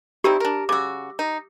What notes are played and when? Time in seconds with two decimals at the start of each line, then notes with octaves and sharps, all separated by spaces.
0.24 C4 D#4 E4 G4 D5
0.40 D4 A#4
0.69 C#3 F#4 D6 E6
1.19 D#4